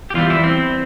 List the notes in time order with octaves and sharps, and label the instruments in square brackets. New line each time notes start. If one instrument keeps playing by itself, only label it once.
[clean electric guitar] G4
E2 E3 G3 F4
E4
C4